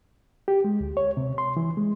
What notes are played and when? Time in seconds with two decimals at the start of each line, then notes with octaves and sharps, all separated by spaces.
0.48 G4
0.64 G#3
0.81 D2
0.97 C#5
1.17 C3
1.38 C6
1.57 E3
1.77 G#3